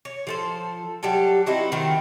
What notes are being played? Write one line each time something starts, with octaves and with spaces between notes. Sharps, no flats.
C#5
F3 A4 C5
F#3 G3 G4 A4
C4 D#4 E4 F#4
D#3 A3 B3 C4